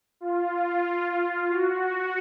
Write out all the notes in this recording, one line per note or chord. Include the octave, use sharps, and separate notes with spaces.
F4
F#4